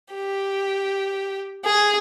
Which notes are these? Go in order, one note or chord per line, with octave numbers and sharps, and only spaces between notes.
G4
G#4